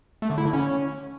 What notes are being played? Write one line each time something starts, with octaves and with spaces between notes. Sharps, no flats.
A3
D3
E4
D3
C#4